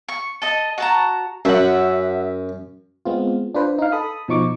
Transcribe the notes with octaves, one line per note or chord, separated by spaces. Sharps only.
C#6
A4 D#5
F#4 A5 A#5
F#2 E5 F#5
G#3 B3 C4 F4
D4 F4 B4 C5
D#4 F5
A4 B5 D#6
B2 F3 D#4 C#6 D6